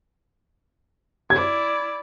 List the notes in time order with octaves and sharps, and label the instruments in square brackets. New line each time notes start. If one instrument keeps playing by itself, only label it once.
[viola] E4 D5 [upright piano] G#6